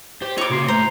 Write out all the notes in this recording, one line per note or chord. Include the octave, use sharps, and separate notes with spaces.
G4 C5
D#4 F4 A4 C#5 D6
C#3 A#3 C4 F#4 C6 C7
A2 C5 A#5